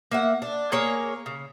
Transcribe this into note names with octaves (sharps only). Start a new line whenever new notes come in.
A#3 E5 F#5
D4
A#3 G#4 A#4 C#5
C#3